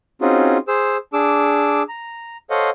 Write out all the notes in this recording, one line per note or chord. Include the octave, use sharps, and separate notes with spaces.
C4 C#4 D#4 F4 F#4 G#4
G#4 C5 E6
D4 G#4 D6 E6
A#5
A4 C5 C#5 D#5 F5 F#5